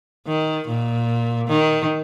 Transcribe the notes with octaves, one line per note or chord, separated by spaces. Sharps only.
D#3
A#2
D#3